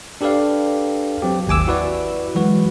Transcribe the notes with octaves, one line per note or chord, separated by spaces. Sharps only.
D4 G4 A4 B4 D5 F5
F#3 C4 G4
G#1 D#2 G#5 D6 E6
E4 F#4 B4 D5
E3 F#3 G#3 F#4 B4